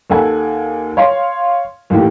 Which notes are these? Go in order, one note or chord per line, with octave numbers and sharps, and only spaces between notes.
D#2 A4 F#5 G#5
C#5 F5 C6
D#2 A2 E3 G4